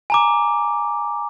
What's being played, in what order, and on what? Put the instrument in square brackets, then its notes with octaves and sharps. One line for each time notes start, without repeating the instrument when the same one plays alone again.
[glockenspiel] G#5 A#5 D6